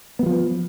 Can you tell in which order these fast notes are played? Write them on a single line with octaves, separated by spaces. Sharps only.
B3 F#3 F3